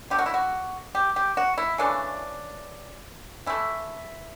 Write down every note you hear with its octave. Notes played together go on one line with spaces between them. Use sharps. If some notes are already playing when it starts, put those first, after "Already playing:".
D3 A3 G4
F#4
E4
F#4
G4
G4
F#4
E4
C#3 E3 A3 D4
E3 A3 E4